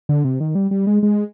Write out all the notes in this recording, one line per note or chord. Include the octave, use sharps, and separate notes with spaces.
D3
C3
D#3
G3
G3
G#3
G#3